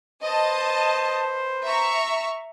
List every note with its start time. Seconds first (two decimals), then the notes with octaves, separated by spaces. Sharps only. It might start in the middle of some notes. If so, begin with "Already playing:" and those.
0.23 B4 C5 D#5 A5
1.65 E5 A#5 C#6